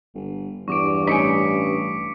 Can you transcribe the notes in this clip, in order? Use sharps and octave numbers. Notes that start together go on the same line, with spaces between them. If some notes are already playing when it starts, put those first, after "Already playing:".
G1
E2 G2 C#6 D6 D7
A1 C#4 D#4 B6 C#7 D7